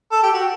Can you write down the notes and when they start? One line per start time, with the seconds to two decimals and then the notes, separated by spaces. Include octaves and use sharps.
0.11 A4
0.23 G4
0.34 F#4